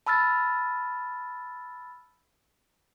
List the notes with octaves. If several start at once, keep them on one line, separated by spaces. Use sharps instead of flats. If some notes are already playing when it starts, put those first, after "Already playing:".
A5 B5 E6 F6 A6